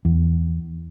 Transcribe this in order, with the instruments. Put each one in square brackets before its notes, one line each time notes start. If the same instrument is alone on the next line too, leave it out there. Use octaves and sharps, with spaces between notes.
[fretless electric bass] E2